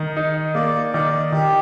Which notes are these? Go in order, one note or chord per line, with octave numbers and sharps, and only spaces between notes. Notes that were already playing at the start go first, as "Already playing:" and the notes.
Already playing: D#3
D#4
A#3 D5
D#3 D5
D#3 G4